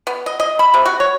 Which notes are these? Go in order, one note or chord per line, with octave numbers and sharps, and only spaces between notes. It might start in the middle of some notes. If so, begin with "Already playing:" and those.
B3
D#5
D#5
B5
C3
F#4
C#5